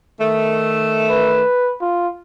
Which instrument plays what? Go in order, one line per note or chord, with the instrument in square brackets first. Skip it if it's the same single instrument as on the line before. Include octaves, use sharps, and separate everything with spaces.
[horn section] D#3 A3
[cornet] B4
F4